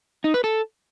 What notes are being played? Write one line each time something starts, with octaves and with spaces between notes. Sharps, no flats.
D#4
B4
A4